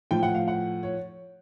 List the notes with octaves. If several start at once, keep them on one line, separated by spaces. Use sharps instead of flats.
A2 F3 G5
F#5
F5
F#5
C#5